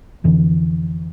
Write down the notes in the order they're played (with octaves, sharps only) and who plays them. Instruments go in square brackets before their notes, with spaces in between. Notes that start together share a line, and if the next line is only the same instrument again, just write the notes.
[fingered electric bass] F2 D3 E3